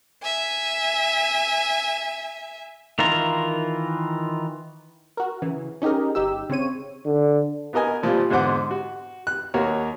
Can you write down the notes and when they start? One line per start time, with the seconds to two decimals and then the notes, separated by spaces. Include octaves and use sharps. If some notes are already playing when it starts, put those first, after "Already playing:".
0.22 E5 G#5
2.99 D#3 E3 F4 A#4
5.17 F#4 A#4
5.42 C#3 E3
5.82 C#4 D#4 G4 G#4 A#4
6.15 G1 D#4 G4 E6
6.50 C#3 C4 C#5 D#7
7.06 D3
7.73 B3 F#4 A#4 D#5 G#5
8.03 A#2 F3 G3 F5
8.30 E2 G#2 D3 C5 F#5 D6
8.71 F#4
9.27 F#6
9.54 D#2 A#3 F#4 A#4 C#5